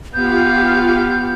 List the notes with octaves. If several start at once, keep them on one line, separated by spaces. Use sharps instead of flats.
B3 F4 G4 F5 G6